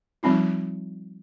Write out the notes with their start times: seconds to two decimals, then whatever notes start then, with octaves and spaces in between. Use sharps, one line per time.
0.23 F3 G3 C4 D#4 F4